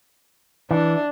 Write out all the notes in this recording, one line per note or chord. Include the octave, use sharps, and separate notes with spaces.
E3 D4